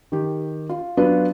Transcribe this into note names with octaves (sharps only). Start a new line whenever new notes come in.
D#3 G4
F4
F#3 B3 D4 F4 B4